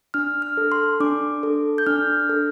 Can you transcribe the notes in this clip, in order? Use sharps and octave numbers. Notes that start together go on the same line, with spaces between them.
D4 F6
F6
A4
C6
D4 D6
A4
G6
D4 F6
A4